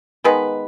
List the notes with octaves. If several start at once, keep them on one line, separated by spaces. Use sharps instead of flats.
D#3 G#3 B3 B4